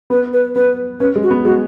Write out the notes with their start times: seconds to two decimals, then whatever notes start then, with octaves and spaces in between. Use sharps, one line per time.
0.10 B3 B4
0.33 B4
0.56 B3 B4
1.00 C#4 B4
1.16 G#3
1.23 F#4
1.31 B3
1.45 G#3 F#4